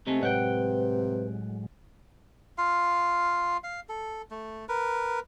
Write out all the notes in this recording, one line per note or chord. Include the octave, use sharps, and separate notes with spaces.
C3 G#3 A3 C4 D#4
A2 F#3 G#3 B4 F#5 G5
F4 F5
F5
A4
A3
A#4 B4